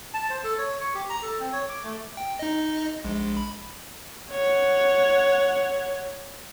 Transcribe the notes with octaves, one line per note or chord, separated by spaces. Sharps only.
A5
C5
A4
C#5
C#6
G4
A#5
A4
C4
C#5
D6
A3
G5
D#4 D#5
A#1 G#3
B5
C#5 F#5